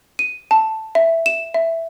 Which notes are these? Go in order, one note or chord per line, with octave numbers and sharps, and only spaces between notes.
D#7
A5
E5
E7
E5